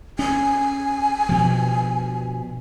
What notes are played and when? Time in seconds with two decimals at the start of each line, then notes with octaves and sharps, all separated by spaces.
0.19 C#4 G#5
1.29 G2 B2 F3